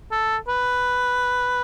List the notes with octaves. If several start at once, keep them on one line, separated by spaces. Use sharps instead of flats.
A4
B4